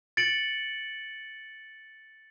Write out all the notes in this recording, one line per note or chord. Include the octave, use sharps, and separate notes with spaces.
A6 C#7 D7 F#7